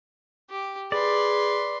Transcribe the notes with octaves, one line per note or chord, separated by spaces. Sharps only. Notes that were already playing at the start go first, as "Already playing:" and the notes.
G4
G#4 B4 D5 C6